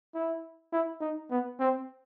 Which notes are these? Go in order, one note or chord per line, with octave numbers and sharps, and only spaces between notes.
E4
E4
D#4
B3
C4